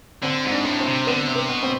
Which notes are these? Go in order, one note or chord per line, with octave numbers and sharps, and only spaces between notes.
D3 C4
G#2
D4
A2
C4
C3
D3 B3
C3
B3
B2
C4